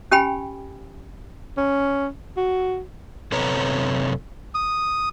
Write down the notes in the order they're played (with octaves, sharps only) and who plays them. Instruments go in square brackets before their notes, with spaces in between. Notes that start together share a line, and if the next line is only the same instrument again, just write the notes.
[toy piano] C#4 G4 G5 G#5 B5
[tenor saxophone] C#4
F#4
[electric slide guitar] F#2 C3 A4 B4 C#5 A#5
[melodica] D#6